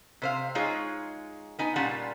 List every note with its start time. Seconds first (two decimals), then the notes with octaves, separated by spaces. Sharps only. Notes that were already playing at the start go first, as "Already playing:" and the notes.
0.22 C3 C5 F5
0.55 G#3 D#4 F4 G#4 C#5
1.59 B3 D#4 G#5
1.76 A#2 G3 C#4 F4 F#5 A5